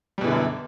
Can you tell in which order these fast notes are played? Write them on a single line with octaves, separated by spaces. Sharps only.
G3 B2 E3 D3 F#2